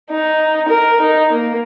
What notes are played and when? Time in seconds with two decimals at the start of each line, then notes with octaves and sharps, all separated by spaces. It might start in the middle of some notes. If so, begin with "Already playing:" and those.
0.10 D#4
0.68 A#4
1.01 D#4
1.32 A#3